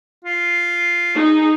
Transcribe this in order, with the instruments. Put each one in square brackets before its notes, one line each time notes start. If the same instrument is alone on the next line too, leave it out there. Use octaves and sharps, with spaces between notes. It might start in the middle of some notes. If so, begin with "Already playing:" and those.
[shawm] F4
[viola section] D#4 G#4